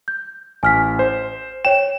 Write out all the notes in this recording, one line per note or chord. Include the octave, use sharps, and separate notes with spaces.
G6
A1 G#5 F6 B6
C5
C#5 G5 E7